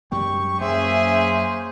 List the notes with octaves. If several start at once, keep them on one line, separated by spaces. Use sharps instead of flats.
F#2 G3 G#3 G4 C#6
F#2 A#3 C#4 G#4 C5 E5